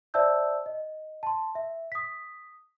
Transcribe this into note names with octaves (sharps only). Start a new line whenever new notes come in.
C5 D5 E5 A5 E6 G6
D#5
A5 C6
E5
D#6 B6